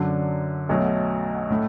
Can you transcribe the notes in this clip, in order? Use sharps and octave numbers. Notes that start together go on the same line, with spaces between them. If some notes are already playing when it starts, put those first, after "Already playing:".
Already playing: F#2 D3 F#3 D4
B1 B2 F#3 A3
A2 A3